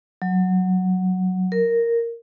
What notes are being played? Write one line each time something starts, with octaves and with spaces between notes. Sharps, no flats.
F#3
A#4